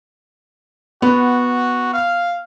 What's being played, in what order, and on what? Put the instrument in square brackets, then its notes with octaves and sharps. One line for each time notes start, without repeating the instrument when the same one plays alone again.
[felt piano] B3 [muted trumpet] F#4
[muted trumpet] F5